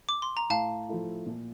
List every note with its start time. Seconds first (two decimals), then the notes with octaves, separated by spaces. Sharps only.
0.09 D6
0.22 C6
0.37 A#5
0.50 A2 F5 A5
0.88 F3 A3 E4
1.26 A#2